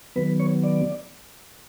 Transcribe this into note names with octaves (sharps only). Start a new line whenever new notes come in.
D#3 F#3 B3 B4
C#5
D5